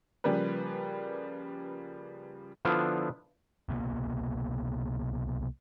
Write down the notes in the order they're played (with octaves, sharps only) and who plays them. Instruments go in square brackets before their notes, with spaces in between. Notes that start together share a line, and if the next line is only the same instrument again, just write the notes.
[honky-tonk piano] C#3 F3 G3 A#3 B4
[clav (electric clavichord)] D3 F3 B3 D4 E4 F4
[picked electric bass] C2 B2 G#3 A#3